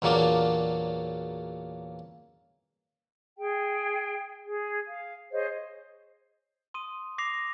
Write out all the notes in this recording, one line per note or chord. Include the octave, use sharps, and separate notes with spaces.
E2 A#2 F#3 A#3 D4
G#4 G5
G#4
F5
G#4 C5 C#5 D#5
C6 D#6 D#7
D6 A#6 C7 F7